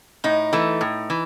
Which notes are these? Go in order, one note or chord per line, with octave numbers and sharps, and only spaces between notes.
A2 D#4
E3 A3
A2
E3